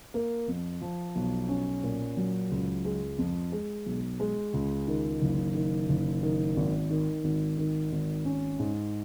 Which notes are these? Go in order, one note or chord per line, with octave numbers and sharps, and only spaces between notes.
A#3
F2
F3
B1
C#4
A#2
F#3
C#2
G#3
F2
G#3
B1
G#3
C#2
D#3
F#1
D#3
F#1
D#3
G#1
D#3
G#1
D#3
G#1
C#4
G#2